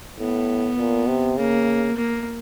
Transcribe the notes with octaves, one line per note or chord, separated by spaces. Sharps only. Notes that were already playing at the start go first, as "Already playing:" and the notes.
A2 B3
A#2
C3
C#3 A#3
A#3